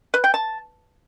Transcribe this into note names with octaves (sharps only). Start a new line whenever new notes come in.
B4
G5
A5